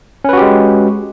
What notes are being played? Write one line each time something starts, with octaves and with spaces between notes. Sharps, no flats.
G#3 C#4 F#4 G4 B4